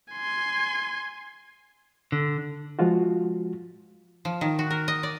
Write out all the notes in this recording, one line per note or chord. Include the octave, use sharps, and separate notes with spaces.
G#5 C6
D3
F3 G#3 F4 F#4
F3
D#3
F#4
A#4
D#5
D5